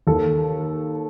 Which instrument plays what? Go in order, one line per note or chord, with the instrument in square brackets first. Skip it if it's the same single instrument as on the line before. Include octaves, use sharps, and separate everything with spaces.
[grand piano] D#2 A4